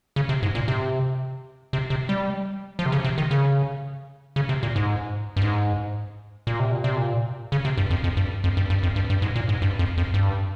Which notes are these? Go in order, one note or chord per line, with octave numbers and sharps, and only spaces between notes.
C#3
C3
G#2
A#2
C3
C3
C3
G3
F3
C3
C#3
C3
D#3
C#3
C#3
C3
A#2
G#2
G2
G#2
A#2
C3
A#2
C3
A#2
C#3
C3
G2
F2
F2
G2
F2
G2
G2
F2
G2
G2
G#2
A#2
G#2
G2
F2
F2
G2